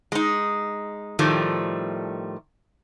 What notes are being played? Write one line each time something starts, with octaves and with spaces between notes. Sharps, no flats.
G#3 D#4
A2 D#3 F3 G3 A3